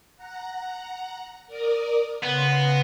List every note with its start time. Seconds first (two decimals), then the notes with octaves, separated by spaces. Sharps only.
0.17 F#5 A#5
1.46 A#4 D5 D#6
2.23 C#3 B3 C6 A#6